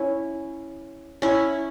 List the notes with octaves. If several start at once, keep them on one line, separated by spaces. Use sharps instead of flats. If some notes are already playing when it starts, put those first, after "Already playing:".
Already playing: C#4 E4
C#4 E4